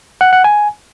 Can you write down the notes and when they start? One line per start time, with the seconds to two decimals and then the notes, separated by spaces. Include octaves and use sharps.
0.21 F#5
0.33 F#5
0.44 G#5